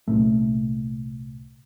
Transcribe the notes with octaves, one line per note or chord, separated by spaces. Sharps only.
C2 A#2 A3